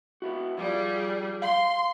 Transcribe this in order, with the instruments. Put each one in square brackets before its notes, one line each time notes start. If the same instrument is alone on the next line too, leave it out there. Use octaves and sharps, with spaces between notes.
[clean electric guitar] B3 E4 F#4
[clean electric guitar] F3 [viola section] G3 G#4
[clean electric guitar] F5 [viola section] C6